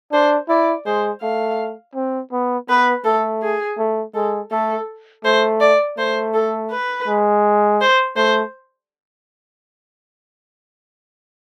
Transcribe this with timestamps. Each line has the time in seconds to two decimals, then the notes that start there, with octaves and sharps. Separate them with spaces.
0.12 D4 C5
0.49 E4 D5
0.86 G#3 C5
1.22 A3 F5
1.95 C4
2.32 B3
2.69 B3 B4
3.05 A3 A4
3.42 G#4
3.78 A3
4.14 G#3 A4
4.51 A3 A4
5.25 A3 C5
5.61 D5
5.98 A3 C5
6.34 A4
6.71 B4
7.07 G#3
7.81 C5
8.17 A3 C5